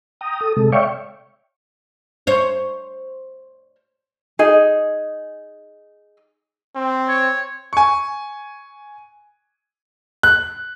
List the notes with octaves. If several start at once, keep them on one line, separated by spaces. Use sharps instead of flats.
G5 A#5 D#6
A4 D#6
C3 G#3 A4
C#5 D5 E5 F5 G5 C#6
C5 C#5
D#4 G#4
C4
C#5
G#5 C#6
F#6